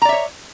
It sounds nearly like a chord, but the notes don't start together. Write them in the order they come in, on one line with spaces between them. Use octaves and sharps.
A#5 D5 E5 C#5